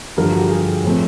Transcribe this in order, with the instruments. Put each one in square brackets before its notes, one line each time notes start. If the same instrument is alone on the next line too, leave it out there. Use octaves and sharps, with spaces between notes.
[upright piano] G2 D3 F3 A#4
F#4
G4
G#4
A2 F3 A3 C4